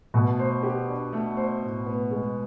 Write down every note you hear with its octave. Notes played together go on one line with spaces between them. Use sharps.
B2 A3
C5
G4
D4
A3
C5
A2
B3
G#3